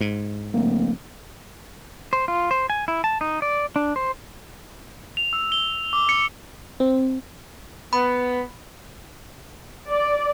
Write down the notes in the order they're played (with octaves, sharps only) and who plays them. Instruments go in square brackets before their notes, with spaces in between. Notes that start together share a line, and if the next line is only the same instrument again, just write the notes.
[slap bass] G#2
[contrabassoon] D1 [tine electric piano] A#3
[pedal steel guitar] C5
F4
C5
G#5
E4
A5
D#4
D5
D4
C5
[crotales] F7
E6
G7
D6
C#7
[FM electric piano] C4
[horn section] B3 [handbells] B5
[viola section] D5